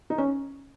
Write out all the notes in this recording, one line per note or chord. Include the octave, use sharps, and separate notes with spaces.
D#4
C#4